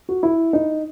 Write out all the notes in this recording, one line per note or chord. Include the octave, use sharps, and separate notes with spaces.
F#4
E4
D#4